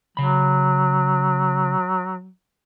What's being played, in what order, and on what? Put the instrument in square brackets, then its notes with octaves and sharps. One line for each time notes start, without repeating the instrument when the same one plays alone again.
[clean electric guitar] C#3 B5 [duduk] F#3